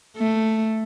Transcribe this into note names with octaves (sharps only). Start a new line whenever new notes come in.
A3